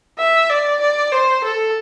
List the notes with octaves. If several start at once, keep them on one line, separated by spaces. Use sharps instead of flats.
E5
D5
D5
C5
A4